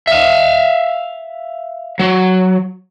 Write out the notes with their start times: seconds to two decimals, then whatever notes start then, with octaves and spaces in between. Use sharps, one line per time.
0.07 E5 F5
1.99 F#3